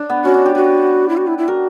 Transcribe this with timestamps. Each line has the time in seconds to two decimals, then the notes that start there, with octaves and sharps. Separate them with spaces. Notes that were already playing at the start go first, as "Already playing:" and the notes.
Already playing: D4
0.10 B3
0.25 C#4 F#4
0.34 D4
0.46 G4
0.55 F#4 B4
1.09 E4
1.17 F#4
1.27 E4
1.38 E4
1.48 F#4 A#4